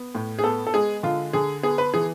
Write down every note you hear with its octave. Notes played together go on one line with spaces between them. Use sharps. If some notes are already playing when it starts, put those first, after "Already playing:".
Already playing: B3
A2
G#4
B3 A4
A4
G#3 G#4
D3 F4
D3 G#4
B3 G#4
B4
E3 G#4